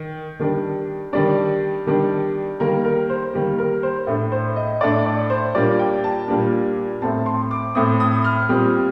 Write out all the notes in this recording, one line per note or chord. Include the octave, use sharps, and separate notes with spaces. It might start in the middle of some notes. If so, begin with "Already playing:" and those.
Already playing: D#3
D#3 G3 D4
D#3 G3 D4 D5
D#3 G3 D4
D#3 G3 A#3 A#4
A#4
C5
D#3 G3 A#3
A#4
C5
A2 A3 D4
C5
D#5
A2 A3 D4 D5
D5
C5
A#2 G3 A#3 D4 D5
G5
A5
A#2 G3 A#3 D4
A2 A3 C4 A5
C6
D6
A2 A3 C4 D#6
D#6
F6
A#2 G3 C4